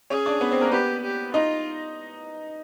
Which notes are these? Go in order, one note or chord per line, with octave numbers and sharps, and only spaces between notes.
C#4 G#4 C#5
D4 D5
B3 B4
C4 C5
A#3 A#4
B3 G4 B4
G4
D#4 F4 D#5